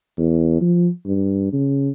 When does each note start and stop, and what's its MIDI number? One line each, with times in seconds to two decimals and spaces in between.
0.18 0.57 40
0.61 0.89 53
1.06 1.48 43
1.53 1.90 49